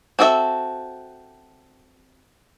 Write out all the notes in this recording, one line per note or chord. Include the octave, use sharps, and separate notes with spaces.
C4 F#4 A4 D#5 E5